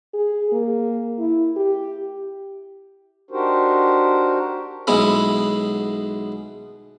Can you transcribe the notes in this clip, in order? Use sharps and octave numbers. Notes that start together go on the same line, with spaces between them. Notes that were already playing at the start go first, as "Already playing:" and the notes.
G#4
A#3
E4
G4
D4 D#4 F#4 G4 A#4 C5
B1 G#3 B3 E4 B5